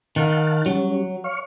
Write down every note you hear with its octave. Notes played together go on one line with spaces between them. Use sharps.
D#3 F5 F#5 A5
F#3 G3 C#4
C#5 F5 C#6